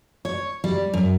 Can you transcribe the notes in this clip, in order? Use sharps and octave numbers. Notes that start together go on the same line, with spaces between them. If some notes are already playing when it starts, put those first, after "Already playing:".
C#5
G3
F#2